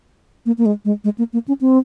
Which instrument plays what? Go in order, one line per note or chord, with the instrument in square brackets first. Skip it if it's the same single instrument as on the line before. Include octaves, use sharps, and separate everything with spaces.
[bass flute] A#3
A#3
G#3
G#3
G#3
A#3
A#3
C#4
C4